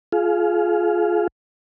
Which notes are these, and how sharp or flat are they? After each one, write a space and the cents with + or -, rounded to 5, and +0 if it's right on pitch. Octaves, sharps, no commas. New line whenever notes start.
F4 +0 G#4 +25 F5 +0